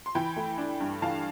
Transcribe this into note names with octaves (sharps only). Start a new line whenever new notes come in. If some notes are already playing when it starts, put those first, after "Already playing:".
C6
E3 G5 B5
A3
D4
G2
E3 F5 A5